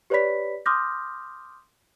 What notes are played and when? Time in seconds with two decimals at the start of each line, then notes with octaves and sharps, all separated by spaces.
0.10 G4 B4 C#5 D5 B5 B6
0.66 C6 D6 D#6 F6 G6 A#6